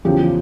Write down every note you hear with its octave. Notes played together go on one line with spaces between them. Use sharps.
E2 C#3 F3 G4